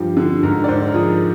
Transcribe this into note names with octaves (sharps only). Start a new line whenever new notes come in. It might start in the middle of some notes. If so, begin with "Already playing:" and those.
Already playing: G2 F3 G4
D3
G#2 A#4
D5
G#2 C5
A#4
F3 G#4